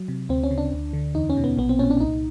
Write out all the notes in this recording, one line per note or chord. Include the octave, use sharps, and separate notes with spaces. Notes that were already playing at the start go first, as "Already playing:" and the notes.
Already playing: F#3
C3
D2 C4
C#4
C#3
D4
D2
D3
E2 D#4
C#4
B2
B3
A#1 B3
C4
A#2 C#4
D4
C2 D#4